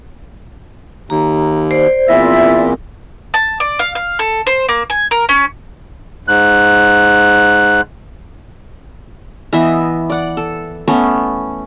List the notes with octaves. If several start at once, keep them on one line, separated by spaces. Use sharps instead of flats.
D#2 A#5
C5 D5
E2 A#2 C4 E4 F4 A#4 E5
A5
D5
F5
F5
A4
C5
A#3
G#5
A#4
C#4
G#2 F#6
E3 B3 D#5 E5
D5 F#5
A4
A3 B3 C#4